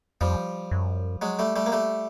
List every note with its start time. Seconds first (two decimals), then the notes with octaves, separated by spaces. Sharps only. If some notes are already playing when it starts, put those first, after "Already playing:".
0.21 F2 F3 G3
0.71 F#2
1.22 F#3 G#3
1.39 G3 A3
1.56 G3 A3
1.66 A#3
1.72 G3 A3